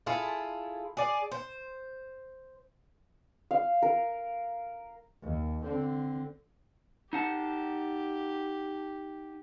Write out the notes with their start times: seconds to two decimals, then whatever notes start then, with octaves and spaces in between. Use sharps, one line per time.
0.06 E4 F4 G#4 A4
0.97 G#4 D5
1.31 C5
3.51 F5
3.82 A#4
5.23 D#2
5.63 D3 C4
7.13 D#4 G4 F#5 A5